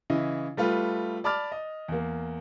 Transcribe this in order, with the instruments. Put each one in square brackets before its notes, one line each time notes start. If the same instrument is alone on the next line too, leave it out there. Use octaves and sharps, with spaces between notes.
[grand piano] C#3 E3 E4 D#5
G3 A3 F4 B4
D5 A5 B5 D6 F6 A6
D#5
E2 A#3